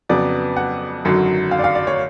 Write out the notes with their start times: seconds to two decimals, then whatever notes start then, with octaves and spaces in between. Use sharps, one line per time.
0.09 F2 C#3 F#3 B3 D5
0.56 F#5
1.05 G#1 F#2 D3 F#3
1.51 F5
1.59 D5
1.64 F5
1.75 D5
1.87 C#5